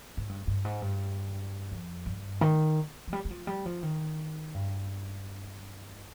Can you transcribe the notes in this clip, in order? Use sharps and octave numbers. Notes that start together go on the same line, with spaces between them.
G#2
G2
G2
G#2
G2
F2
G2
D#3
F3
G3
G3
F3
G3
F3
D#3
G2